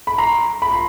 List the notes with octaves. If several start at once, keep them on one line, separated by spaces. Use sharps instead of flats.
B5
A#5 C6
B5
C6